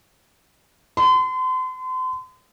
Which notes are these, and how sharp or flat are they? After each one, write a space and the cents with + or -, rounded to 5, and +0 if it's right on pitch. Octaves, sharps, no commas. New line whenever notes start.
C6 -40